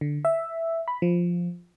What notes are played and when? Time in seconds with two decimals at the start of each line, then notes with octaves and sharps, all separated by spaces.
0.01 D3
0.25 E5
0.88 B5
1.02 F3